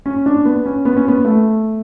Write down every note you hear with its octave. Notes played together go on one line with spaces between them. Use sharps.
C#4
D4
B3
C#4
B3
C#4
B3
A3